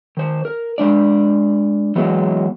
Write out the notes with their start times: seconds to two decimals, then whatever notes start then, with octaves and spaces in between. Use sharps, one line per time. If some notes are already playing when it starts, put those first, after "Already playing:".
0.17 D#3 C5
0.45 A#4
0.78 G#3 D4 D5
1.96 E3 F#3 G#3 B3